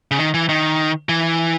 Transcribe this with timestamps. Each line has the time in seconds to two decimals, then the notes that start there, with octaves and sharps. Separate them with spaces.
0.11 C#3
0.18 D#3
0.34 E3
0.49 D#3
1.09 E3